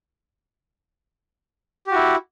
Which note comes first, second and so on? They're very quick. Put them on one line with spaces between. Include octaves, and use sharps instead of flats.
G4 F#4 E4